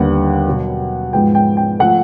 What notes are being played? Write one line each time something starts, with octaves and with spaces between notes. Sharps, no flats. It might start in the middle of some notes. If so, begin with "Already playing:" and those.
Already playing: D#2 D3 G3 B3 F#5
B2 F#3 B3
G#2 F3 G#3 B3 G5
G5
G5
F3 A3 F#5